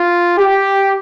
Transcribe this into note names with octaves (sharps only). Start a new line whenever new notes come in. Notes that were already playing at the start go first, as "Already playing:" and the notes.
Already playing: F4
G4